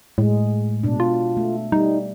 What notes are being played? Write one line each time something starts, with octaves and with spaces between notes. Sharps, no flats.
A2 G#3
B2 D4
F4
A3
G3 D#4